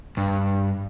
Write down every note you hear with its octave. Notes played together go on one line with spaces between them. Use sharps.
G2